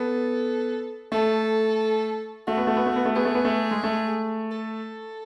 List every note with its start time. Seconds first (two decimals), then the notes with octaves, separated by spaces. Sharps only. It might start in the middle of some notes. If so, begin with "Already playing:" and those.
Already playing: B3 A4
1.12 A3 A4
2.47 A3 F#4
2.57 B3
2.67 A3
2.77 B3
2.86 A3
2.96 B3
3.06 A3
3.16 B3 G#4
3.25 A3
3.35 B3
3.45 A3
3.71 G#3
3.84 A3
4.51 A4